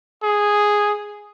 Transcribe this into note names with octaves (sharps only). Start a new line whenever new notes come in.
G#4